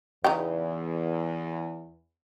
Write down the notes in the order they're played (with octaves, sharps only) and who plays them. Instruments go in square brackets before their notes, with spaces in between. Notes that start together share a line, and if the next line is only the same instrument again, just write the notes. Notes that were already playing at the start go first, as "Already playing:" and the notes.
[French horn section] E2 [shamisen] C#3 D#4 G5